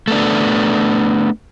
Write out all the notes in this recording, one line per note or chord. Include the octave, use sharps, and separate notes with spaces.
A3 B3 D4